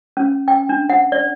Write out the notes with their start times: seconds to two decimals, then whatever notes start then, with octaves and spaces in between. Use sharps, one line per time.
0.17 C#4
0.48 G5
0.69 D4
0.90 F#5
1.12 D5